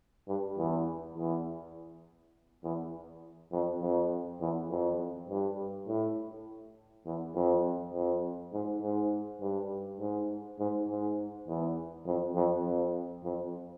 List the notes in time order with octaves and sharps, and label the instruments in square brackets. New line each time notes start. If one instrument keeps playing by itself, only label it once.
[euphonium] G2
E2
E2
E2
F2
F2
E2
F2
G2
A2
E2
F2
F2
G#2
G#2
G2
G#2
G#2
G#2
E2
F2
F2
F2
F2